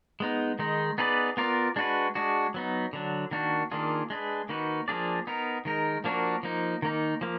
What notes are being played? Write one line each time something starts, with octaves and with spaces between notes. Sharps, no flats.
G#3 B3 D#4
D#3 G#3 D#4
B3 D#4 G#4 B4 D5
B3 F4 A#4 D5
G#3 D4 F#4 B4
G#3 D4 F#4
F#3 B3 D#4
D3 F#3 D4
D#3 A#3 D4 F#4
D#3 A#3 D4 F4 G#4
G#3 D4 G#4 B4
D#3 A#3 D#4 F#4 B4
F3 A#3 D4 G#4 D5
B3 D#4 A#4
D#3 G#3 D#4 A#4
F3 A#3 D4 F#4 A#4
F3 A#3 D#4
D#3 A#3 D#4
F3 A#3